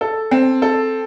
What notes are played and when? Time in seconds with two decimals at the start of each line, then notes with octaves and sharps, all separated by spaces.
0.01 A4
0.31 C4
0.62 A4